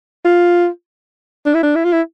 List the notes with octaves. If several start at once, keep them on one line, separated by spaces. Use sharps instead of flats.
F4
D4
E4
D4
E4
F4
E4